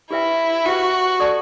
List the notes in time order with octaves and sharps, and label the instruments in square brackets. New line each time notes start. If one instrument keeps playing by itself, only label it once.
[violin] E4 [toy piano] G4 B4 E5 G5
[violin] F#4 [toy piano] G4 B4 E5 G5
[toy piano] A4 D5 A5 C#6